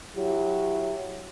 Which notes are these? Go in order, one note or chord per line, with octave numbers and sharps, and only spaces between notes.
F#3 E4 G4